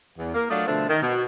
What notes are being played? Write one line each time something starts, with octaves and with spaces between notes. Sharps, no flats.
E2
A#3 A#4
F#3 A3 D4 F4 D5 D#5
B2 D3 F3 A3 C4 D4
D#3
B2